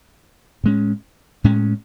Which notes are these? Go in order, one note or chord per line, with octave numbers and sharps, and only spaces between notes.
A2 G#3 C#4
A2 G#3 C#4